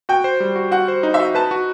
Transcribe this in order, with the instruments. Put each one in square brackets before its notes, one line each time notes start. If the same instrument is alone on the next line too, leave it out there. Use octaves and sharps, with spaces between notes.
[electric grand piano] F#4 [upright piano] G5
[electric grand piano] C5
G3
F#4
[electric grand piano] F#4 [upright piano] F#5
[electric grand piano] C5
D#4
[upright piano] E5
[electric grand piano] F#4
[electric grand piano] B4 [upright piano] A5
[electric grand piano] F#4